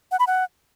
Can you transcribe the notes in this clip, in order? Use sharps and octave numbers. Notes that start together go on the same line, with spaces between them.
F#5
B5
F#5